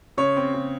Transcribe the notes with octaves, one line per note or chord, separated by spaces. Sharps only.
C#3 C#5
C4
C#3